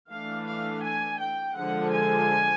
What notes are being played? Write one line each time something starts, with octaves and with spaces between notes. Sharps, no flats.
E3 A3 D4 F5
F5
G#5
G5
D3 F3 G#3 F#5
G#5